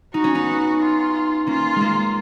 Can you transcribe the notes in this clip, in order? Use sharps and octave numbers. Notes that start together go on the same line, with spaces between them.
D#4 F#4
C#4
B3 D#4
F4
A#3 C#4 F4
G#3
A#3